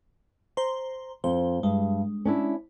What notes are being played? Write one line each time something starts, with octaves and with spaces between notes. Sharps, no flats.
C5 A#5 C6
F2 C5
G2 G#3
C#4 D4 E4